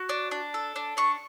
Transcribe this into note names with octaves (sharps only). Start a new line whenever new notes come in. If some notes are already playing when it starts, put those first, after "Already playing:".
Already playing: F#4
D4
D4
A4
D4
D4 C#6